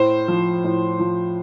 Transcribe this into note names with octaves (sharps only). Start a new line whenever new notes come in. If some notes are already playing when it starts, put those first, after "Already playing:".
Already playing: A2 C5
F3
A2
F3